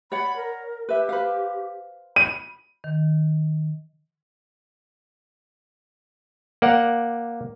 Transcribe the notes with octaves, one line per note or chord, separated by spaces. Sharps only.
C#5 D5 F#5 B5
A#4
G4 B4 E5
B4 C5 F5
B5 D#7
D#3
A#3 D5 F#5